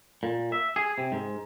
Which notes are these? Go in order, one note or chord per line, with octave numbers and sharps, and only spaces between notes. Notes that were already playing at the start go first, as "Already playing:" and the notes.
A#2
E5
G#4
C3
G#2